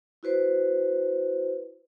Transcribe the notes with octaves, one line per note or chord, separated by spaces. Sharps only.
E4 F#4 B4 C5